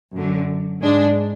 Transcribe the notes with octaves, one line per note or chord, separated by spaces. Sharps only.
F#2 D3 F#3
G#2 G#3 D4